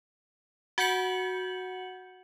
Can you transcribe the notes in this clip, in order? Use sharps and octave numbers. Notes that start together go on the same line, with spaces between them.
F#4 F#5 G6 C#7 F#7